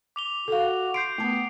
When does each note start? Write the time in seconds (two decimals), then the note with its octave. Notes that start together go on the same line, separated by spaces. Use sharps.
0.16 D6 F7 G7
0.48 F#4 A4 F5
0.94 C6 G6 C7 D7
1.18 A3 B3 A5